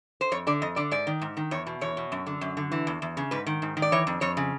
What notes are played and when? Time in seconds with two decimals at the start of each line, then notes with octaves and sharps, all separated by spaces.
0.21 C5
0.32 F2 C#5
0.47 D3 D5
0.62 F2 D#5
0.76 D3 D5
0.91 G#2 D5
1.07 D#3
1.21 G#2
1.37 D#3
1.51 E2 C#5
1.67 B2
1.81 E2 C#5
1.97 B2
2.12 F#2
2.26 D3
2.41 F#2
2.57 D3
2.72 E3
2.87 E2
3.02 E2
3.17 C#3
3.31 G#2 B4
3.46 D#3
3.62 G#2
3.77 D#3
3.82 D5
3.92 E3 C#5
4.07 F2
4.21 F2 C#5
4.37 C#3